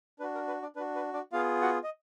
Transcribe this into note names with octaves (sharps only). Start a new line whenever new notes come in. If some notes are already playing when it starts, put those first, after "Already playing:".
D4 F#4 B4
A#4
B4
D4 D5
D4 F#4 B4
B4
D4 D5
B3 F4 G#4 F5
F#4 F#5
D#5